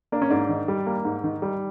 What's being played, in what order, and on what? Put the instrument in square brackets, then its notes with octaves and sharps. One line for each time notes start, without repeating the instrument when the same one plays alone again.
[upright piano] A#3 D4
C#4
G#2 D4
D#3
G3
A#3
G#2
D#3
G3